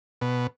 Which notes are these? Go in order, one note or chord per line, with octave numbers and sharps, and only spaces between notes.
B2